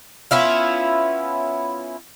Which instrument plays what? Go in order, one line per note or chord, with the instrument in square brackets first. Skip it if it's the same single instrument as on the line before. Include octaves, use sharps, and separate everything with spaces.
[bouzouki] B3 C#4 E4 F4